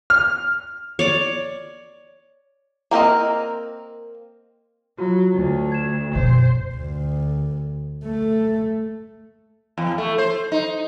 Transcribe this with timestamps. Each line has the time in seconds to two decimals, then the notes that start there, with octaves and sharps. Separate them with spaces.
0.10 F6
0.99 C#5 D5 D6
2.91 A#3 C4 A#4 D#5
4.98 F#3 F4 F#4
5.35 D2
5.72 G#6 E7
6.15 F#2 B2 C5
6.74 D2
8.05 A3
9.78 E2
9.98 A3
10.18 C5
10.52 D#4